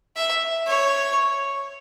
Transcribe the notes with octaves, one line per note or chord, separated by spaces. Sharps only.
E5
C#5